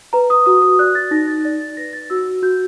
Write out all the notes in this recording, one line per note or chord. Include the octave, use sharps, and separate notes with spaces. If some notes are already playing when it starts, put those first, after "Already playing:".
B4 A#5
D#6
F#4 D#6
D#6
D5 F#6
A6
D#4 A#6
A6
D5 A6
A6
B4 A#6
A6
F#4 E6
F#4 G6